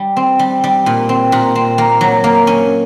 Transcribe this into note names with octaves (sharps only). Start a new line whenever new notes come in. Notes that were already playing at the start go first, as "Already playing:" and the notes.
Already playing: G3
C4
G3
G3
A#2
C4
A#2
C4
A#3
F#3
A#3
C#4